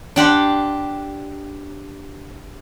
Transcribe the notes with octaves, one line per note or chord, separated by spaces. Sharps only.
D4 G4 F#5 C6